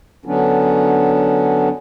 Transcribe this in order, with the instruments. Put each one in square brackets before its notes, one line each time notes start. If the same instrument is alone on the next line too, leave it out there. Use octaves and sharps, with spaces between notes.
[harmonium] D3 F#3 B3 C#4 D4